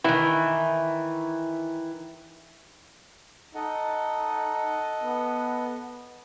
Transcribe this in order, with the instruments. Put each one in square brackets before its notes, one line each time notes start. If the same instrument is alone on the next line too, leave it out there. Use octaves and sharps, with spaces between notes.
[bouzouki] D#3 E3 [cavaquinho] E4
[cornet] D#4 [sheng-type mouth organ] A4 D#5 F#5
[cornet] B3